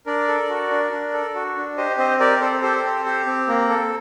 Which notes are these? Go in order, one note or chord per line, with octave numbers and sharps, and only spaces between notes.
D4 A#4 D5
A4
F#4
D4
D4
A4
F#4
D4
G4 C5 D#5
C4 C5 D#5
G4 A#4 D5
C4 A4 C5
G4 A4 C5
C4
G4
C4
A#3 A#4
A4